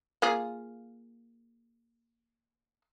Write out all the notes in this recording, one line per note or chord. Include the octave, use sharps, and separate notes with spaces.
A#3 F4 G#4